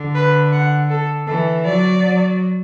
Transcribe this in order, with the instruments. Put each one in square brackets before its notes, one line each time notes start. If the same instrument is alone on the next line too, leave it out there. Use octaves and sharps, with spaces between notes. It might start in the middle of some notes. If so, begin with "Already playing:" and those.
Already playing: [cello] D3
[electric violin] B4
F#5
A4
[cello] E3 [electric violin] A4
[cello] F#3 [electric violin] D5
[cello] F#3